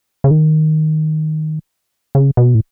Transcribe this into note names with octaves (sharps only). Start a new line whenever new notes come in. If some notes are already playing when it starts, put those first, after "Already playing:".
C#3
D#3
C#3
B2
A2